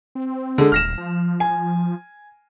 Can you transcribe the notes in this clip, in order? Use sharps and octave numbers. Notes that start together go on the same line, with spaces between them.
C4
D3 G#3
D#1 F6 A#6 E7
F3
G#5